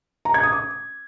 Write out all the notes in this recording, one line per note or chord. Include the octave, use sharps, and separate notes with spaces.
A#5
G#6
D#6
D6